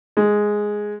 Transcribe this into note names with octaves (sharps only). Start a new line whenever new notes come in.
G#3